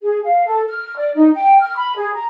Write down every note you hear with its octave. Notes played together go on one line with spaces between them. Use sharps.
G#4
F5
A4
F6
D5
D#4
G5
F6
B5
G#4
A#5